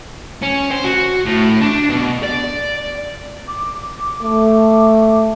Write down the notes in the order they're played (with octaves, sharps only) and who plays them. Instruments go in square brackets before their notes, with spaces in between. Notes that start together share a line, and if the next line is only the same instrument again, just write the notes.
[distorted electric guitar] C#4
C5
F#4
A2
D4
B2
D5
[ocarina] D6
[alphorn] A3